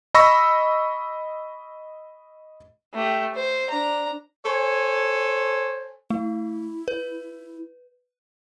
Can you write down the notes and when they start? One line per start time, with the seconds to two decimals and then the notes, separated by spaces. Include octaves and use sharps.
0.14 D#5 B5 C#6 E6 A#6
2.94 A3 G4
3.35 C5
3.70 D4 A#5
4.46 A4 C5 C#5 G#5
6.10 A3 E4
6.88 B4